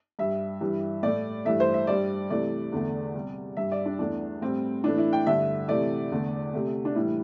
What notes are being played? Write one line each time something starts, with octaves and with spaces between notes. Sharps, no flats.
G2 G3 E5
G2 E3 G3
A2 A3 D5
G2 E3 A3 E5
C5
E5
G2 G3 D5
C3 E3 A3 D5
E2 D3 A3
C3 G3
G2 G3 E5
D5
D4
E2 E3 A3 D4
A2 G3 C4
A2 E3 A3 D4
E4
G5
G2 D3 A3 E5
C3 E3 A3 D5
E2 D3 A3
C3 A3
D4
A2 E3 G3 E4